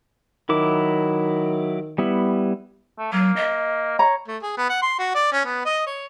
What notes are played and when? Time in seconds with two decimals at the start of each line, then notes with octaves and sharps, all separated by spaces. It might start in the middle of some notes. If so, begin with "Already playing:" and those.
0.49 D#3 F#3 E4 D6
1.98 G3 B3 E4
2.98 A3
3.12 F#3 A#3
3.36 D#5
3.99 C#5 A#5
4.28 A3
4.43 G#4
4.58 B3
4.70 F#5
4.82 C6
4.99 F#4
5.15 D5
5.32 C#4
5.45 B3
5.65 D#5
5.86 C#5